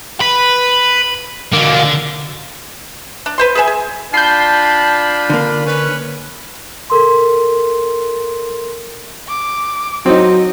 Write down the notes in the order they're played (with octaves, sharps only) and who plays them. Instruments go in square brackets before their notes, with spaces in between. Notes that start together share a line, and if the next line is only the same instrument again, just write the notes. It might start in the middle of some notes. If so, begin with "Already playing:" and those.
[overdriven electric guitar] B4 [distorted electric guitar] B5
[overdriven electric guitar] B2 A#3 [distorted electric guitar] D3
[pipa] D4
B4 C5 C6
G#4 B4 E5 G#5
G#4
[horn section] D4 F4 B5 [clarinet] A5 [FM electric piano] G6 C7
[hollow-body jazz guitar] D3 A#3
[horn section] C#4 B4
[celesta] A4 A#4 C6
[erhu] D6
[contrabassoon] F#3 [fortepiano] C4 D#4 [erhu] D#5